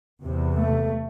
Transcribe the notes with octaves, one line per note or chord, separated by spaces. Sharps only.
E2 C3
A3